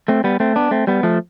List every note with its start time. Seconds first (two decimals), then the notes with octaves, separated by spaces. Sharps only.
0.08 A3 C4
0.24 G3 B3
0.40 A3 C4
0.56 B3 D4
0.71 A3 C4
0.87 G3 B3
1.03 F3 A3